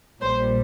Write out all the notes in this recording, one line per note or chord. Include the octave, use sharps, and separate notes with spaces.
A#1 A#2 G3 C5